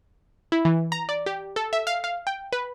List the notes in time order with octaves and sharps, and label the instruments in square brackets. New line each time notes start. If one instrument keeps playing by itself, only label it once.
[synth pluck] E4
E3
A#5
D5
G4
A4
E5
F5
F5
G5
B4